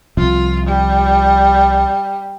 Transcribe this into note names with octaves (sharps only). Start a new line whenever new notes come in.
C2 C3 F3 F4
G3